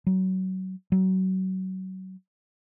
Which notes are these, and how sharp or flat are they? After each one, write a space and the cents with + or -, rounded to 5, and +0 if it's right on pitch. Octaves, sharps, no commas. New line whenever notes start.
F#3 +20
F#3 +25